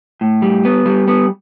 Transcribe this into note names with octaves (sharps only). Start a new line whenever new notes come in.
A2
G3
B3
G3
B3